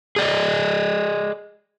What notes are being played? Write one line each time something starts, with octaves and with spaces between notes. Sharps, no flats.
G#4 D5 D#5